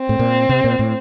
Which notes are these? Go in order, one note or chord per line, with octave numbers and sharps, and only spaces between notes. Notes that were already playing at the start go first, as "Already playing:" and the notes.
Already playing: C4
A2
A#2
C3
A#2
A2